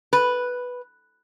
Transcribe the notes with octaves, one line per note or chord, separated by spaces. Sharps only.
B4